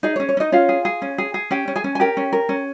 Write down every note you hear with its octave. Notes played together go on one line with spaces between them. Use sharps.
D#4 G#4 D#5
C#4 C#5
C#5
C#4
D#4 D#5
C#4 F4 F5
G#4
G#4
C#4
G#4
G#4
C#4 G4 G5
C#4
G#4 G#5
C#4
G#5
G4 A#4 G5
C#4
A#4
C#4